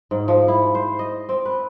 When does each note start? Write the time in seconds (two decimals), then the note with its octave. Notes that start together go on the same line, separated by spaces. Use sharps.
0.11 G#2
0.28 F3
0.48 E4
0.75 C5
0.99 D#5
1.29 C4
1.45 B4